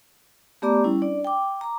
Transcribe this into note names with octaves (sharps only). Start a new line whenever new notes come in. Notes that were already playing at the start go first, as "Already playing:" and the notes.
A3 B3 G4 D5 A#5 D6
G3 C#4 E4
D4 D5
G5 D6
A#5 D6